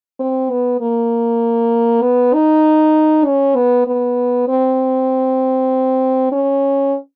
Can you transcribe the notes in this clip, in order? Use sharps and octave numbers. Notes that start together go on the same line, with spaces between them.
C4
B3
A#3
B3
D#4
C#4
B3
B3
C4
C#4